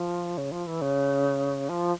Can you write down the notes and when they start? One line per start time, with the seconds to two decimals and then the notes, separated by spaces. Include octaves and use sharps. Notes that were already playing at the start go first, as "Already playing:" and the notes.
Already playing: F3
0.38 C#3
0.52 F3
0.67 E3
0.82 C#3
1.69 F3